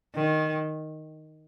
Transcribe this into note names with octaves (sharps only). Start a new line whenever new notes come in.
D#3